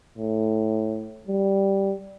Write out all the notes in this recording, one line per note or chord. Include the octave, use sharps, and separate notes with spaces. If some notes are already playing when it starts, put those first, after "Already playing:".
A2
G3